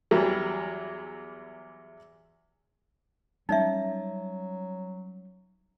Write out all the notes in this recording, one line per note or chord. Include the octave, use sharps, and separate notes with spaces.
E2 E3 F#3 G3
F#3 G3 C#4 D#4 D5 E5